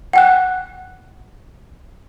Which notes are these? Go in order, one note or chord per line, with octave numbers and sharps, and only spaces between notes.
F#5 G5 F#6